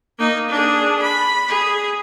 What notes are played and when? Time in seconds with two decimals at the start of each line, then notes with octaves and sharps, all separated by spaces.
0.18 A#3 D#4
0.49 D4 G#4
1.02 B5
1.48 G#4